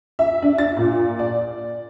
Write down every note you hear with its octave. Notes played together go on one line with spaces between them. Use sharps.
E5
D4
A6
A#2
D5